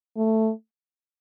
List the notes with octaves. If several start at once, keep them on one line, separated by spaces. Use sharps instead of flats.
A3